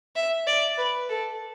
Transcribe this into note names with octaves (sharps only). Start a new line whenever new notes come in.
E5
D5
B4
A4